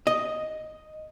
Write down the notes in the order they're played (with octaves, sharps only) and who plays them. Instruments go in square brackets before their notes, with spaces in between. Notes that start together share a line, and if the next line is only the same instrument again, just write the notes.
[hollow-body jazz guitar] D#5